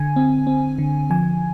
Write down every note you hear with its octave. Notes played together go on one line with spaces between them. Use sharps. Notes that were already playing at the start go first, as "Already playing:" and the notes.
Already playing: D3 G#5
C4
C4
D3
F3 G#5